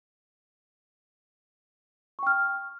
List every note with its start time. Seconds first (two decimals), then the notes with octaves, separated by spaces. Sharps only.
2.19 C#6
2.23 G5
2.27 F6